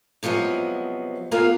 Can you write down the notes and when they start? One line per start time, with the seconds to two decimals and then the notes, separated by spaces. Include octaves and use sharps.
0.23 C3 F3 F#3 G#3 B3
1.31 A#3 B3 F4 G#4 A#4 F5